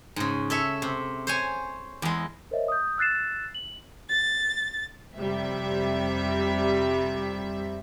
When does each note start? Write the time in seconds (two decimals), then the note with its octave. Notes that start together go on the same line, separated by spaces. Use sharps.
0.16 G#2 C#3
0.50 A4 C#5 E5
0.82 C3
1.27 C5 C#5 G#5
2.02 E2 G#3
2.51 A#4 C5 C#5 D#5 E5
2.68 D#6 G6
2.98 E6 F#6 A6 C7 E7
3.54 F#7
4.08 A6
5.16 F2 C3 G3 E5